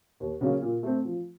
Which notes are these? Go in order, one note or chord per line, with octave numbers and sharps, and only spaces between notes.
D#2
C#3 F#3 A#3 C#4
A#2
A3 C4
F3